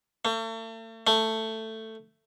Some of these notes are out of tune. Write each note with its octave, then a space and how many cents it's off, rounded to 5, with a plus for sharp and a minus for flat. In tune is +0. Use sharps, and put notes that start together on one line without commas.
A3 +40
A3 +10